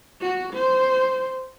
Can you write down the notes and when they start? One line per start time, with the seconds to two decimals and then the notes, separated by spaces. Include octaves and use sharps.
0.21 F#4
0.54 C5